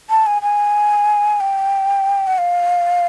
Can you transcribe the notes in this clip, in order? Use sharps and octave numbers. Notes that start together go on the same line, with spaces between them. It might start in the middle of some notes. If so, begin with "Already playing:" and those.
A5
G#5
G#5
G5
F#5
F5